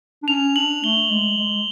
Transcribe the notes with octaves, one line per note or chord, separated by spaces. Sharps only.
D4
C#4 F7
D4 F#7
A3 G7
G#3
G#3